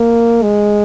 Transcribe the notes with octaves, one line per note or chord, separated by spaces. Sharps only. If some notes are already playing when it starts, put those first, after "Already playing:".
Already playing: A#3
G#3